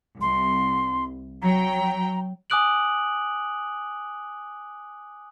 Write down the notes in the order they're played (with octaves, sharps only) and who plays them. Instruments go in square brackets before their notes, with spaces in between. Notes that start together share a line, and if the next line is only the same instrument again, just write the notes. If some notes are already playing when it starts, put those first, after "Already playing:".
[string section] C2 [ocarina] C6
[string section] F#3 G5 [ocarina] A#5
[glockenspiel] G#5 D6 D#6 F#6 D7 F#7